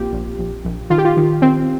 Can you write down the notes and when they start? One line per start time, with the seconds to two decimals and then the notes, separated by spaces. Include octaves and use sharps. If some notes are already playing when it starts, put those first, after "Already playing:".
Already playing: A#1 A#3 C4 F4 G4
0.13 A#1
0.39 A#1
0.65 A#1
0.90 D#3 F4
0.98 G4
1.05 F4
1.17 D#3
1.42 D#3 C4